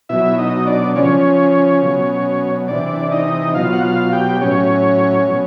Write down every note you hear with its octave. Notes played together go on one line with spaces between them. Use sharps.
B2 F#3 E4 E5
D#4 D#5
D4 D5
C#3 F3 C#4 C#5
B2 F#3
C3 E3 D4 D5
D#4 D#5
B2 F#3 F4 F5
F#5
F4 F5
G4 G5
A2 F#3 C#4 C#5
B2 F#3